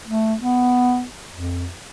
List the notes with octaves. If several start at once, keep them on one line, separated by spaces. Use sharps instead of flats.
A3
B3
F2